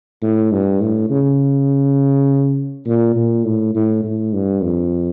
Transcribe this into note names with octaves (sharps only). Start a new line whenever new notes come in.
A2
G2
A2
C#3
A#2
A#2
A2
A2
A2
G2
F2